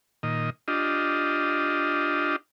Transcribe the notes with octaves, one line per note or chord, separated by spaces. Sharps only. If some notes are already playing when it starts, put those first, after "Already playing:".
A#2 D#3 D#5
D4 F4 G4 D#5